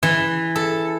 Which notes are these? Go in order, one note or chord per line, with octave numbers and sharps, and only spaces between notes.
E3
A4